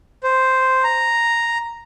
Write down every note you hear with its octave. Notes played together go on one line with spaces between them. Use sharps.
C5
A#5